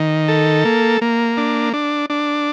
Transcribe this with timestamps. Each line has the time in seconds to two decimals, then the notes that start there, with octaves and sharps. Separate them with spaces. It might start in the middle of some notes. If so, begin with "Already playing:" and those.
Already playing: D#3
0.28 A4
0.65 A#3
1.01 A#3
1.37 D4
1.73 D4
2.10 D4